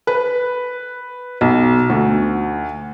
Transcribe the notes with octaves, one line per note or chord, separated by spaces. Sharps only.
B4
B1
D2